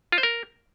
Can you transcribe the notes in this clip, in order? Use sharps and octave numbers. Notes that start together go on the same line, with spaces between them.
F4
C5
A#4